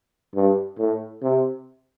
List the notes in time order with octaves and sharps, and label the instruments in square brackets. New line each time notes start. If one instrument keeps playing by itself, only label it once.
[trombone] G2
A2
C3